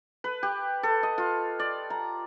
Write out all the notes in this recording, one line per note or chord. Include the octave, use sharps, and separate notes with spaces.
B4
G4
A4
D#5
F4
D5
A#5